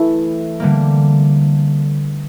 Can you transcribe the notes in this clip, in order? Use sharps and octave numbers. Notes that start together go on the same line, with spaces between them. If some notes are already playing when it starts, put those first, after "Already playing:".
Already playing: E3 A3 E4 A4
D3 G3 A#3